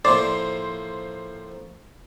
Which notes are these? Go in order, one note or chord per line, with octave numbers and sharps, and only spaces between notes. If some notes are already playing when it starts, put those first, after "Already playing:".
A2 F3 A#3 C5 D5 C6